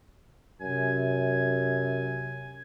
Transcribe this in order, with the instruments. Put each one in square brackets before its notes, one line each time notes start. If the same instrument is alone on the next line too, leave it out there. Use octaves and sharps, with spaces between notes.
[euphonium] F#2 [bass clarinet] C3 [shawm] G#5